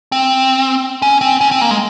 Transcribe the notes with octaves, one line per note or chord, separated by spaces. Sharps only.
C4
C#4
C4
C#4
C4
A#3
G#3